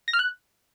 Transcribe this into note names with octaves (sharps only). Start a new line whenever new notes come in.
A#6
F6
F#6